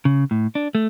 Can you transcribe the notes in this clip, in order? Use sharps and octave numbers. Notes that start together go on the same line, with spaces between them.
C#3
A2
D4
A3